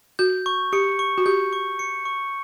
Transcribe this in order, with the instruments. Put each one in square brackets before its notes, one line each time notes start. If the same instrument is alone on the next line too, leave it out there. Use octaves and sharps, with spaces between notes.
[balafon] F#4 [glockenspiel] G6
[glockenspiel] C#6
[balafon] G4 [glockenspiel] C#7
[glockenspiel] C#6
[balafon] F#4
[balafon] G4 [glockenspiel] G6
[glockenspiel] C#6
C#7
C#6